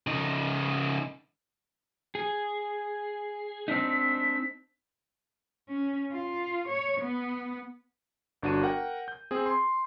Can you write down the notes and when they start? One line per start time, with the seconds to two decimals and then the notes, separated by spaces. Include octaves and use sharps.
0.07 C#3 D#4
2.15 G#4
3.68 C4 D4 D#4 B6
5.69 C#4
6.12 F4
6.68 C#5
7.01 B3
8.43 G1 D4 F#4 D#7
8.63 A#4 F#5 G5
9.08 G6
9.31 C4 G#4
9.46 C6